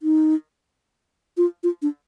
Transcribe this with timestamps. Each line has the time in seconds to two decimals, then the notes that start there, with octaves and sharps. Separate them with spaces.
0.03 D#4
1.37 F4
1.63 F4
1.82 D4